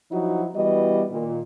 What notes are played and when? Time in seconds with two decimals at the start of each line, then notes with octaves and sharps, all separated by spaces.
0.12 F3 F#3 D#4 E4 F#4
0.55 E3 G3 B3 F#4 D#5
1.11 A#2 D#3